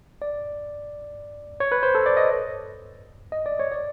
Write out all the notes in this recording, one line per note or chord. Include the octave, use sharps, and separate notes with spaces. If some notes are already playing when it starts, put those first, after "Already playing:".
D5
C#5
B4
C5
A4
D5
D#5
D#5
D5
C#5
D5